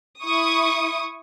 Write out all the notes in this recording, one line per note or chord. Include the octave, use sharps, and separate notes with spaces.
E4 C#6 D#6